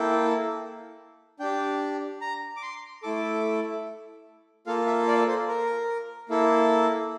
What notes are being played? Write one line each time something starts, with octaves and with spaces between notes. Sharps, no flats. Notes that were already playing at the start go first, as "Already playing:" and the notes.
Already playing: A#3 E4 A4 G5
D4 G4 G5
A#5
D6
C6
A3 E4 A4 D6
A#3 F4 A4 F5
E5
D5
C5
A#4
A#3 E4 A4